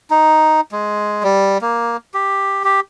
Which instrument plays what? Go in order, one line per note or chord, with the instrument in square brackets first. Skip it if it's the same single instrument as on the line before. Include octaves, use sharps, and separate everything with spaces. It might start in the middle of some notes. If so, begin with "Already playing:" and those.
[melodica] D#4
G#3
G3
A#3
G4
G4